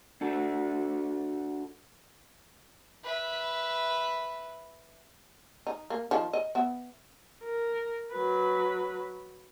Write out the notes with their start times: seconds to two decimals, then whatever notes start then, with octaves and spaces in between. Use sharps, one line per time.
0.21 D4 F#4 A4
3.04 B4 E5
5.67 D#4
5.90 A#3
6.11 D#3 F3
6.33 D#5
6.55 B3 E5
7.44 A#4
8.11 F#3 B4